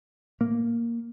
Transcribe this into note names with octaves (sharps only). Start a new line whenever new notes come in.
A2 A#3